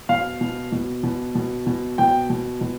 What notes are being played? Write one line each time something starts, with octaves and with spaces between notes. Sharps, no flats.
B2 F5
B2
B2
B2
B2
B2
B2 G5
B2
B2